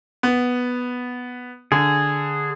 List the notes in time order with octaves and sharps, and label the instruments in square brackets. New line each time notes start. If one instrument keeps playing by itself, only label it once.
[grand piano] B3
[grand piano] D3 [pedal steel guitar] G#4